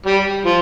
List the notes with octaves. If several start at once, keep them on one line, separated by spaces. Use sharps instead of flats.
G3
F3